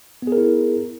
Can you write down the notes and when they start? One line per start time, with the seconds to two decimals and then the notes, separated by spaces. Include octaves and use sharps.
0.22 B3
0.27 G#4
0.32 A#4
0.37 E4